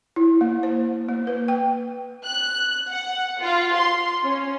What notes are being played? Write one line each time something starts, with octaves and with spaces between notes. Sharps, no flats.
E4
A#3
C5
A#3
B4
G5
F#6
F#5
F4
C6
C#4